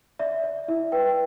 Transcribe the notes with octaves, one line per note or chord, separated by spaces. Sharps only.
D5 E5
D5
E4 E5
B4 G5